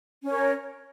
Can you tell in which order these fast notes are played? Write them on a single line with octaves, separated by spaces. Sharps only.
C#4 C#5 A#4